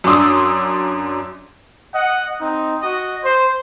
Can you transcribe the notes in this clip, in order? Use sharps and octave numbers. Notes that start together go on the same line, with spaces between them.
F#2 D4 D5 C6 D#6 E6
D#5 F#5
C4 D#4
F#4 D#5
C5